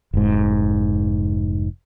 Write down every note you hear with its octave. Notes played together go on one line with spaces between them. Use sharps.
F1 G#2